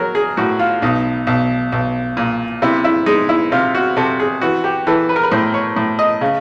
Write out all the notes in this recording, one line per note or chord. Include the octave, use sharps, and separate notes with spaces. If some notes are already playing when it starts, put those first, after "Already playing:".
Already playing: F#3 A#4
G#4
A2 F#4
F4
B1 D#4
B1
B1
A#2
C3 E4
E4
G#3 D#4
E4
C3 F4
F#4
C3 A4
G#4
E3 F#4
G4
E3 A4
B4
A#4
B4
A2 C5
C#5
A2
D#5
C#3